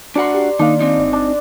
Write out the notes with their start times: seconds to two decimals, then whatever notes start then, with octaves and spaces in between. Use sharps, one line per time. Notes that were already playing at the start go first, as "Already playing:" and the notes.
0.16 D4 F#4 D5 F#5 A#5 C6
0.34 G4
0.59 D#3 A#3 D4 D#4 F5
0.80 C4 D#4
0.98 G1 D5
1.13 D4